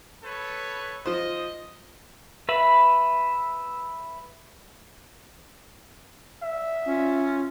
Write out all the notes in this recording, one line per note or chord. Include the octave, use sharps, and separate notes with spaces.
A4 B4 C#5
F3 C5 D#5
B4 E5 B5
E5
C#4 F4